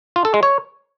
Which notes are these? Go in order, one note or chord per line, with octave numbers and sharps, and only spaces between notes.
F4
A4
G#3
C#5